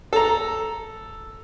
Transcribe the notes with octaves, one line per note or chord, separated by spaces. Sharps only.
A4 A#5